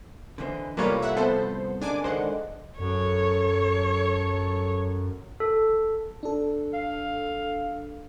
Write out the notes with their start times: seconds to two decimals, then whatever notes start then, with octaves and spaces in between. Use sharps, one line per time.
0.38 D3 E3 B4 C5 D#5
0.77 C2 A2 F3 G3 A#3 F4 B4 C#5
1.02 E5 F#5
1.17 B3 A4 C5
1.81 C#3 G#3 A#3 D4 G#5 D6
2.04 D3 D#3 G#3 C5 F#5
2.79 F#2 A4 C#5
5.40 A4
6.23 D4 A4
6.74 F5